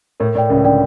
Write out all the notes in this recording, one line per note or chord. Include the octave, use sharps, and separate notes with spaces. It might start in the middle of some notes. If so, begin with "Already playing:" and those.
A2 A#4
A2 D5 G5
C#2 C#3 A#4
D3 D5 G5